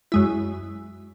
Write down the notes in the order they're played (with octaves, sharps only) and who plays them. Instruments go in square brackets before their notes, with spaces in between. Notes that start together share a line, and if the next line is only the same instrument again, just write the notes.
[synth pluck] F#2 G#3 E4